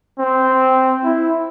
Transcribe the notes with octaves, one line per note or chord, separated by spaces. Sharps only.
C4
E4